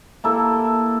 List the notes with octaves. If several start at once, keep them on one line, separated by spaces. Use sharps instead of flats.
A#3 E4 A4